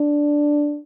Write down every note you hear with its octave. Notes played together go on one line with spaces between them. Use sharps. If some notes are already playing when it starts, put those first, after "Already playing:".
Already playing: D4